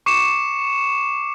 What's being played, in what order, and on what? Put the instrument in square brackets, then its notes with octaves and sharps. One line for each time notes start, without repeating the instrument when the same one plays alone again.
[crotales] C#6 D6 C7 C#7 E7